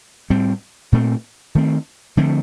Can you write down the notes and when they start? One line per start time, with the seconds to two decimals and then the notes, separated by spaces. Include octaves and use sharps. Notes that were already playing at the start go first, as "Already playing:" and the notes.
0.30 A2 G3 C4
0.92 A#2 A3 C4
1.55 D#3 A3 C4
2.17 D3 F3 A3 C4